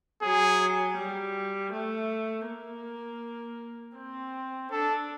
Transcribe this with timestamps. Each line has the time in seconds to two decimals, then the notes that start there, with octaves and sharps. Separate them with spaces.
0.22 F#3 G#4
0.97 G3
1.72 A3
2.47 A#3
3.97 C4
4.71 D4 A4